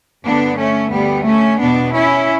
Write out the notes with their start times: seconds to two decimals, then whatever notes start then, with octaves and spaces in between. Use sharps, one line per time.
0.24 G2 D3 B3 D4
0.58 A3 C#4
0.92 D2 D3 G3 B3
1.26 A3 C#4
1.60 E2 B2 B3 D4
1.94 C#4 E4